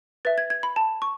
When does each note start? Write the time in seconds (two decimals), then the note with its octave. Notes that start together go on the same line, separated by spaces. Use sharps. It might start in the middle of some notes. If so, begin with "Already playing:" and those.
0.25 B4 E5 A6
0.38 G#6
0.50 G#6
0.63 B5
0.76 A5
1.02 C#6